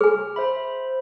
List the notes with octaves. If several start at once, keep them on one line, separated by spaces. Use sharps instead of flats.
G#4 G#5 F6
C5 E5 B5